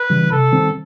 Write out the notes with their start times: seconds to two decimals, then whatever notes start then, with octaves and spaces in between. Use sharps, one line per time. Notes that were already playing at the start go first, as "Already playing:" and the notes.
Already playing: B4
0.10 C#3 E3 G3
0.31 C3 A4
0.52 D#3 G3 C4